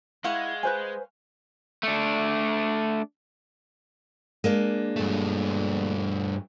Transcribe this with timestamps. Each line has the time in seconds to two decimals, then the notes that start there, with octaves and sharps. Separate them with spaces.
0.24 G#3 E4 F5 F#5 C#6
0.63 B4 C5 G#5
1.83 A3 D4
4.44 G#3 A#3 D4
4.96 G2 A3